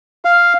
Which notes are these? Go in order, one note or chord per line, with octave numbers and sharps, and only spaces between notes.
F5